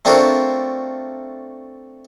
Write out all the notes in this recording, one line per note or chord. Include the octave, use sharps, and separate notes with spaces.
A3 C4 D4 F4 F#4 A#4